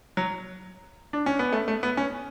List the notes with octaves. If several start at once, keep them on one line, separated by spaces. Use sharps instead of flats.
F#3
D4
C#4
B3
A3
A3
B3
C#4